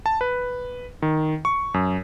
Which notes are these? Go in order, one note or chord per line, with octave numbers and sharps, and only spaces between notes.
A5
B4
D#3
C#6
F#2